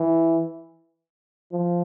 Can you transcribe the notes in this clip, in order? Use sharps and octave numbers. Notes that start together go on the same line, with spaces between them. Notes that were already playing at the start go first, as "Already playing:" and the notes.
Already playing: E3
F3